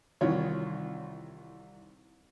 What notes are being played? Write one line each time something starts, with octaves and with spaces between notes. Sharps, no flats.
C2 D#3 E3 F4 C#5